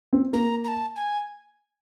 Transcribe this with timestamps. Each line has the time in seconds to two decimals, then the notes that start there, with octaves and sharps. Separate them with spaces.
0.13 C4
0.33 A#3 A#5
0.64 A#5
0.68 A5
0.96 G#5